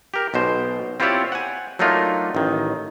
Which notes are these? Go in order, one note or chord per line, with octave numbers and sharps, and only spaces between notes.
G4 A#4
B1 B2 C5
C4 E4 F4 G4 C#5 D5
F#5 G#5
F#3 A3 A#3 D4 D#4 F4
A1 D#3